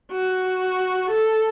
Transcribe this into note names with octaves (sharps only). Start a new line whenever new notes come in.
F#4
A4